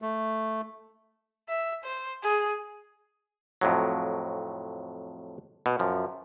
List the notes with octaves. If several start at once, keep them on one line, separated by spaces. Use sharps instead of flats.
A3
E5
C5
G#4
F2 A2 F#3
B2
F#2 F3